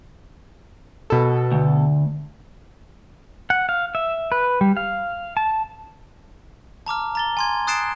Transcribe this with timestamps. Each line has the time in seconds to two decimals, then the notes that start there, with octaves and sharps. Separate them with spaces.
1.10 B2 A4
1.52 D2
3.50 F#5
3.69 F5
3.95 E5
4.32 B4
4.61 G3
4.77 F5
5.37 A5
6.86 A5 A#5 D6 F6
7.15 A#5 A6 G7
7.37 G#5 C6 G#6
7.67 D#6 F#6 A6 C7 D7 E7